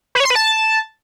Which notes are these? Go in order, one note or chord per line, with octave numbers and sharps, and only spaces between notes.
B4
C#5
C6
B4
A5